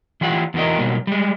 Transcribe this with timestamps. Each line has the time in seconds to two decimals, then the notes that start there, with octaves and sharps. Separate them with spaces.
0.21 E3 F4 G4 F#5
0.54 E2 E3 F#4 A#4 D#5
0.78 B2 F#3 G3 A#3
1.07 G3 G#3